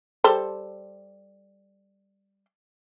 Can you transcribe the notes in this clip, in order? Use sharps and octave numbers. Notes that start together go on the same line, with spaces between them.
G3 A4 C5